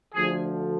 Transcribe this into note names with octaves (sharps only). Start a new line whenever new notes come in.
D2 D3 F3 G#4